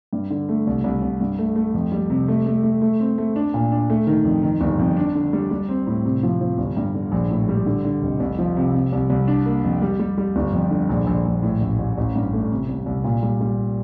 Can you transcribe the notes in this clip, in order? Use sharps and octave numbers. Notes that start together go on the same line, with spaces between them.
G2
D3
A3
C2
C2
C2
G2
A3
A3
F2
G3
C3
A3
A3
A3
A3
C4
A3
D4
A#2
D4
A3
D#3
F2
D#3
G1
F2
D4
D3
G3
G3
C4
A2
C3
F3
F3
G1
G2
D3
A#1
A2
G3
D3
D3
F1
C2
F3
C3
C3
C2
C2
D4
A#3
F2
G3
G3
G3
G1
F2
D3
A#1
A#1
A#1
A2
A1
A1
A1
G2
A3
C3
C2
C2
A#2
G3
G3